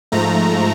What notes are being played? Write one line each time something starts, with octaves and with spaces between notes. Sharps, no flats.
G#2 F3 A3 A#5